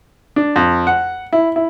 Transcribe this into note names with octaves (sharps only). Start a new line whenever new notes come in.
D4
F2
F#5
E4
E4